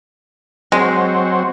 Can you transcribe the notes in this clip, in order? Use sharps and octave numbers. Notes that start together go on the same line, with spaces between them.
F#3 G#3 C4